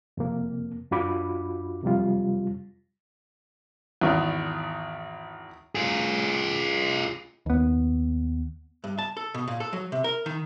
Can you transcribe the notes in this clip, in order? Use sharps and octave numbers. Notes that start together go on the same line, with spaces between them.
F2 C3 A#3
F#2 D4 F4 F#4 B5 D6
F2 C3 F#3 G3 F4
G#1 E2
F4 G#4
D#2 B3
G2
A5
A4
B2
A#2
A4
F#3
C3
A#4
D#3